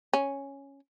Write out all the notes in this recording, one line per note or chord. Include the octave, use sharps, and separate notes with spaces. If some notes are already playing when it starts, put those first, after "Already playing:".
C#4